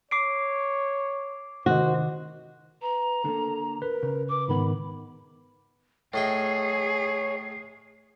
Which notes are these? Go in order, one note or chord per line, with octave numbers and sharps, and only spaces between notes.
C#5 D6 C7 D7
C3 D#3 F#4 C5 D#5
B4 A#5
D3 A#3 A4
A#4 B4
C#3
B4 D6
G#2 D#3 B3 B5
A2 G#4 C#5 D#5 G5 C7